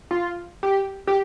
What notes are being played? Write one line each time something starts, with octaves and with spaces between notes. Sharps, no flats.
F4
G4
G4